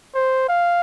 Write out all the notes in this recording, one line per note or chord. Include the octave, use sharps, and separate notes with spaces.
C5
F5